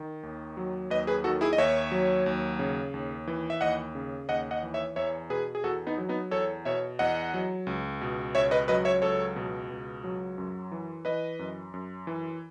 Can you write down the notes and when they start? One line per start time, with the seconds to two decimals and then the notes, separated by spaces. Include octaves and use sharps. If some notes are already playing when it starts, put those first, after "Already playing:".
Already playing: D#3
0.23 D#2
0.57 F#3
0.90 D#2 B4 D#5
1.07 G#4 B4
1.24 D#3 F#4 A4
1.41 E4 G#4
1.53 D#5
1.58 D#2 C#5 E5
1.92 F#3
2.26 D#2
2.59 C#3
2.94 D#2
3.27 E3
3.50 E5
3.61 D#2 D#5 F#5
3.95 C#3
4.29 D#2 D#5 F#5
4.51 D#5 F#5
4.63 E3
4.74 C#5 E5
4.96 E2 C#5 E5
5.30 B2 G#4 B4
5.55 G#4
5.64 E2 F#4 A4
5.87 B3 D#4
5.98 F#3
6.09 B3 D#4
6.31 E2 A4 C#5
6.65 B2 C#5 E5
6.99 E2 D#5 F#5
7.34 F#3
7.67 C#2
8.01 B2
8.35 C#2 C#5 E5
8.51 B4 D#5
8.68 F#3 B4 D#5
8.85 C#5 E5
9.02 C#2 A4 C#5
9.36 B2
9.70 C#2
10.04 F#3
10.38 F#2
10.72 E3
11.05 E3 B4 D#5
11.39 F#2
11.74 F#2
12.07 E3